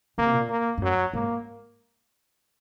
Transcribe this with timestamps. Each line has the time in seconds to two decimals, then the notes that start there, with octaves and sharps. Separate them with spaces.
0.18 C#3 A#3
0.26 C3
0.33 A#2
0.49 A#3
0.78 G#2
0.82 F#2 F#3
1.13 G#2 A#3